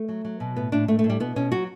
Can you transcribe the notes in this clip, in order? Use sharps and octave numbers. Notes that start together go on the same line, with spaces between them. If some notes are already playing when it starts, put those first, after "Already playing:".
Already playing: A3
F#3
F#3
B2
A2 B3
A2 D4
A2 A3
A3
A2
G3
B2 B3
B2 C#4
F#3 F#4